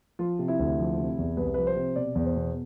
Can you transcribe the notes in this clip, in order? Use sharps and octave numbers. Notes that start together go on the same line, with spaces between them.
F3 F4
C3
E4
D2
F3
C3
E2
C2 B4
F3 B4
C5
C3
B2 D5
E2
C5
B2